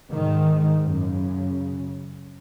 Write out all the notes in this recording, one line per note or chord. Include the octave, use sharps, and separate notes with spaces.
G#2 D#3
F#2 C#3